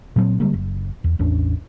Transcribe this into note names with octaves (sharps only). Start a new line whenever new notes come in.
A#2 F#3 G3 C4
D3 G3 G#3 A#3
F#1
E2
A1 E2 C#4 D4